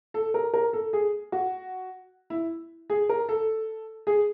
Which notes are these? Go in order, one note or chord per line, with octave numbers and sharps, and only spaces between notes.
A4
A#4
A#4
A4
G#4
F#4
E4
G#4
A#4
A4
G#4